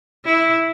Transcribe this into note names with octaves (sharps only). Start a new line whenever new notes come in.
E4